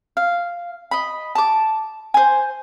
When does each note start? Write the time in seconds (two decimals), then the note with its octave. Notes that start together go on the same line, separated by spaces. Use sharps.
0.17 F5
0.91 D#5 B5
1.35 A5 D6
2.14 C5 G#5